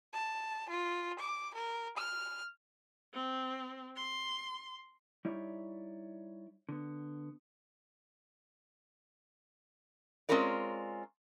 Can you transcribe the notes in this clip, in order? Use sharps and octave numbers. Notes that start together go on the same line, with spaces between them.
A5
F4
D6
A#4
F6
C4
C6
G3 D#4 E4 C#5 D5 E5
D3 B3
G#3 C4 C#4 F4 A#4 D5